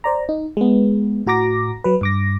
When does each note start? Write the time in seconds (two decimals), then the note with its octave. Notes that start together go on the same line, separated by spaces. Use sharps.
0.04 C5 D5 A#5
0.29 D#4
0.57 G#3 B3
1.27 A2 F#4 A#5 D6 A#6
1.84 F#3 B4
2.01 G2 D6 A#6